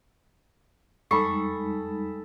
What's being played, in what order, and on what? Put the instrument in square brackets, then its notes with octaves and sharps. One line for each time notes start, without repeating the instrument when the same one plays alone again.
[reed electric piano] F2 [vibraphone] G3 G#3 D#4 [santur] A4 B5 [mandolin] C#6